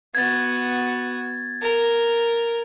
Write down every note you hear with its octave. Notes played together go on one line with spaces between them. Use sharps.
B3 F#4 G#6 A6
A#4